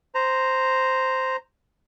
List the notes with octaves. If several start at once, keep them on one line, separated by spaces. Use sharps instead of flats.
C5 A#5